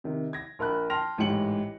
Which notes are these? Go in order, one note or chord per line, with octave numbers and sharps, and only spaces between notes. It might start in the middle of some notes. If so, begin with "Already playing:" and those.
C3 D#3
G#6 A#6
A#1 A#4 B5 F#6
G5 A5 C6 F6 A#6 F7
A1 G#2 E3 G4 C#7 F#7